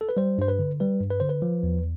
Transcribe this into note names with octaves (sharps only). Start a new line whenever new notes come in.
A4
B4
G3 C5
G2 C5
B4
D3
G3 B4
G2
B4
D3 C5
B4
F3
E2